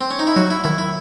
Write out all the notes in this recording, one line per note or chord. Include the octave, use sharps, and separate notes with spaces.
C4
C#4
D#4
E4
F#3 F#4
E4
D#3 E4
E4